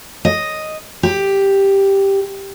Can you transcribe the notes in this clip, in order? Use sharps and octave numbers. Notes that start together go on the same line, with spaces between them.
D#5
G4